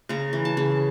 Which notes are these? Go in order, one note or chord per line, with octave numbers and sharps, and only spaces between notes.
C#3 A#5
E3
A5
C#3